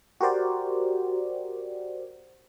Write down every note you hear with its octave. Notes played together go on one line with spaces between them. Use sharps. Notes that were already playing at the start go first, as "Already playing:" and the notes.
F#4 G4 A#4 C5 D5